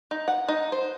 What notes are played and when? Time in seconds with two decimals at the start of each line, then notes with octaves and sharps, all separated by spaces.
0.11 D#4
0.28 F#5
0.49 D#4
0.72 C5